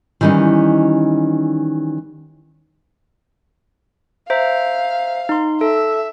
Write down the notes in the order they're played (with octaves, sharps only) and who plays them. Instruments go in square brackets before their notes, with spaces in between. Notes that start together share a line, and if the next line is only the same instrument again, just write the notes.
[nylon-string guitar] D#3 E3 G3 C#4 D#4
[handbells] C5 E5 A#5 [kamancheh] F5
[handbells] D#4 C6
[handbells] A4 [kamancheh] E5